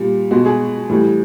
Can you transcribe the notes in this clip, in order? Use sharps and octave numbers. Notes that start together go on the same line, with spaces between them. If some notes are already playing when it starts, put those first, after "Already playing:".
Already playing: A#2 G3
B2 G#3 F#4
G#4
A2 E3 G3